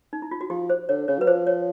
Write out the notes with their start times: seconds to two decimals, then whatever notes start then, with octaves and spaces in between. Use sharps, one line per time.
0.13 D#4
0.22 E4
0.31 F4
0.41 F#4
0.50 F3 G4
0.70 C5
0.89 D3 C#5
1.08 C#3 C#5
1.19 F#3 B4
1.27 F3 C5
1.47 C#5